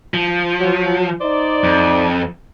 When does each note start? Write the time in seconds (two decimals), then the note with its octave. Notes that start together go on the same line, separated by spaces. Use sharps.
0.14 F3
0.60 F#3
1.21 D#4 C5 D5
1.64 F2